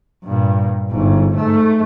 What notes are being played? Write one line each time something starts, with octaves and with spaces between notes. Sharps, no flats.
G2 A#2
G1 G#2
G#2 A3